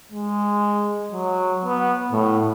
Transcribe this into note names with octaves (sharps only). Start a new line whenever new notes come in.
G#3
F#3
B3
A2